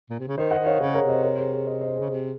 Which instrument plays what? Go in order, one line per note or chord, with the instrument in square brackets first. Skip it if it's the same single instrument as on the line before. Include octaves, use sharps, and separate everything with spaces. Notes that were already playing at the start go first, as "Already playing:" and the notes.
[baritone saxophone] A#2
C3
C#3
[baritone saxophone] D#3 [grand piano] C5 D#5
[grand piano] D#5 F#5
[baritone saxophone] D#3
[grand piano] C#5 F5
[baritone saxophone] C#3 [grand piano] G#4 C5
[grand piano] A#4 C#5
[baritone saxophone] C3
[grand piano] C5 D#5
A#4 C#5
G#4 C5
G#4 C5
C5 D#5
C5 D#5
[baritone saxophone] C#3 [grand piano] G#4
[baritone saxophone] C3